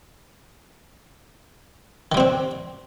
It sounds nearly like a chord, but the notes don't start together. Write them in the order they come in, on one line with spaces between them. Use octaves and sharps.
D#3 G3 C4 D4